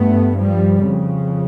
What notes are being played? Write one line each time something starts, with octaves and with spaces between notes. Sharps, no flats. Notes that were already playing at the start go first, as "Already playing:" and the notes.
Already playing: G2 A3 B3
F3 G3
F2 C#3